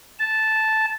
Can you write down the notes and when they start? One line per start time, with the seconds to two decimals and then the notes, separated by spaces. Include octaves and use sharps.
0.19 A5